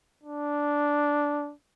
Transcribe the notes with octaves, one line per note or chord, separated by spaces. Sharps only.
D4